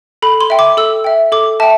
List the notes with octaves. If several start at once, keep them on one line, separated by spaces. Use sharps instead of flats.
A4 B5
C6
E5 G5
D6
A4 E6
E5 G5
A4 D6
E5 G5 A5